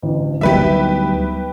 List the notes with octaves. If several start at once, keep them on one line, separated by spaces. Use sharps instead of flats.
A1 D2
D2 F#3 G3 B3 D#4 G4 B4 E5